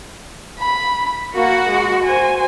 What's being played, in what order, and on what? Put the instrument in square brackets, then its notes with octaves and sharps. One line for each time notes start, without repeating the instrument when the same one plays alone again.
[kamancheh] B5
[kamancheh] A#3 [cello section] F#4
[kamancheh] G#3
C5 G#5